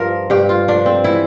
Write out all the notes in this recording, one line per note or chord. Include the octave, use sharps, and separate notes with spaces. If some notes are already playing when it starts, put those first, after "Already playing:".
Already playing: G2 F3 A#4
G2 G4
F4
F3 D4
C4
E3 E4